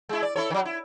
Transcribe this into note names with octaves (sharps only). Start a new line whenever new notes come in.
G#3 E4
D5
E4 A4 C#5
D#3 F#3
E4